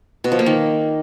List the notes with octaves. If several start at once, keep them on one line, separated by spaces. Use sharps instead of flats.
B2
F3
A#3
D#3